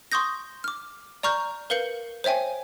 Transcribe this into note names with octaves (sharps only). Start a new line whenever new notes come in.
C6 C#6 D#6 G6 A#6
D6 F6
D5 A#5 C#6 F6 G6
A#4 B4 F5 G6 C#7 F#7
C5 C#5 E5 G5 G#5